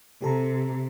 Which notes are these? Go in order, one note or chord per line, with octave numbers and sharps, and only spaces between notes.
C3 G4 A4 A#5